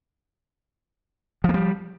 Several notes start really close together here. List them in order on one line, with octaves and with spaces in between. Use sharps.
F3 A#3 G3